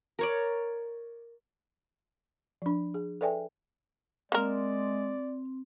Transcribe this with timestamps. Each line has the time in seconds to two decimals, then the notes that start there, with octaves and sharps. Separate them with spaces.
0.19 A#4 C#5 D5
2.62 F3 D4
2.94 G#4
3.21 A4 B4 D5 E5 G5 G#5
4.32 G#3 A#3 C4 A#4 D5